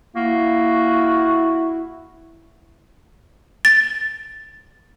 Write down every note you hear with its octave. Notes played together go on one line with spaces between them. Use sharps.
A#3 E4 F#4
A6